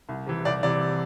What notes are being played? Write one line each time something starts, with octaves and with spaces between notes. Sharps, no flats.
C2
C3 E3
C2 D5
C3 E3 D5